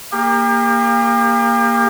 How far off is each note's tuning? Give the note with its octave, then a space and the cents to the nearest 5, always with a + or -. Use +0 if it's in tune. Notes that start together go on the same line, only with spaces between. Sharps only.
A#3 +0 G4 +40